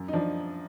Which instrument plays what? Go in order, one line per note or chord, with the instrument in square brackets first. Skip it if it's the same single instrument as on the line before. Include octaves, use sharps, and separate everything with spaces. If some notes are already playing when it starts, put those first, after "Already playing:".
Already playing: [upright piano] F#2
D#4
F3 D4